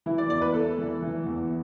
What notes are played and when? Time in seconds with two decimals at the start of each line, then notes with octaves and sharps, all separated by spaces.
0.06 E3 E4
0.18 D5
0.30 E2 D5
0.41 B4
0.54 E2 A4
0.78 E3
1.02 E3
1.26 E2